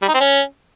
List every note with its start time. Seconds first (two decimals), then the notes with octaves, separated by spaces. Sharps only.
0.02 G3
0.08 D#4
0.14 C4
0.20 C#4